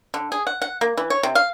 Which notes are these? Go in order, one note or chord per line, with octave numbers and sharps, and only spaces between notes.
D3
G#4
F#5
F#5
A#3
E3
C#5
C3
F5